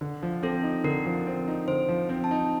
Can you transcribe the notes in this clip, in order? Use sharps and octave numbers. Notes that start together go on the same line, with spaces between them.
D3
F3
C4 A4
D#4
D3 A#4
F3
C4
D#4
D3 C5
F3
C4
A5
D#4